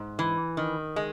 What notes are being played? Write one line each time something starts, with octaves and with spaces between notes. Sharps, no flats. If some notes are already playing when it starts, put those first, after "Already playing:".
Already playing: G#2
E3
D#3
G#3